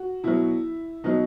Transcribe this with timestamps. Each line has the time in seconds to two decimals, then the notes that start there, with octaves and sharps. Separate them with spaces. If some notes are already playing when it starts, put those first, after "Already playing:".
Already playing: F#4
0.24 B2 F#3 E4
1.04 B2 F#3 D#4